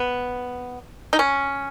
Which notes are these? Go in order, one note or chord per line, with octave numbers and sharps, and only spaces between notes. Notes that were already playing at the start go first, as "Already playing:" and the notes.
Already playing: B3
D#4
C#4